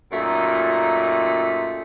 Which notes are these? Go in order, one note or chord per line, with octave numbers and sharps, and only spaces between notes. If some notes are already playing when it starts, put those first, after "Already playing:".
F#2 A#2 A3 D#4